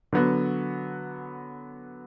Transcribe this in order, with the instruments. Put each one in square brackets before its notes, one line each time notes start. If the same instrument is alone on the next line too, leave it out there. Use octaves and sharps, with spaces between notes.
[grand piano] D3 F#3 B3 F#4